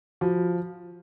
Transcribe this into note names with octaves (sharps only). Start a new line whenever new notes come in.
F3 F#4